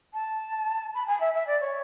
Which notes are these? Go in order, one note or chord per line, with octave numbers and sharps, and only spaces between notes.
A5
B5
G#5
E5
E5
D5
C#5